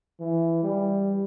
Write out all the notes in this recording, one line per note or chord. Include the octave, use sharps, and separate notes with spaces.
E3
G3